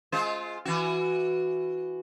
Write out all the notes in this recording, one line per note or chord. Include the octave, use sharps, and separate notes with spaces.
G#3 F4 C5
E3 F#4